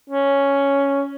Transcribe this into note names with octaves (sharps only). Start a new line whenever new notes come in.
C#4